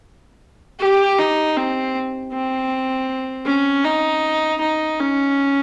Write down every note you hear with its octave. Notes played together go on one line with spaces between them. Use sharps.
G4
D#4
C4
C4
C#4
D#4
D#4
C#4